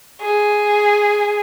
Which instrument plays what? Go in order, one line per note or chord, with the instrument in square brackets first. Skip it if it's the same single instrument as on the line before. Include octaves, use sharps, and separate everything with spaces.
[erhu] G#4